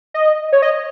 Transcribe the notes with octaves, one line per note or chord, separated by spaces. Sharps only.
D#5
C#5
D#5